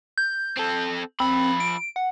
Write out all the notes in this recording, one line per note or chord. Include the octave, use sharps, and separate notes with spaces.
G6
C4 A4
F3 C4 B5
D7
F#5